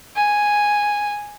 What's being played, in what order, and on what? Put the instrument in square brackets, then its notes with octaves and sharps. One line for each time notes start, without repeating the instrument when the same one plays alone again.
[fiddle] G#5